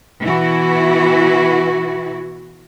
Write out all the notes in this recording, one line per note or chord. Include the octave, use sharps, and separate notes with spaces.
B2 E3 E4 F#4 B4